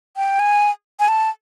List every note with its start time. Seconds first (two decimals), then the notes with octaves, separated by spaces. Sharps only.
0.17 G5
0.39 G#5
1.00 G#5
1.08 A5